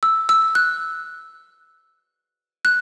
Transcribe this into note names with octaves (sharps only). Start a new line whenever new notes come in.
E6
E6
F#6
F#6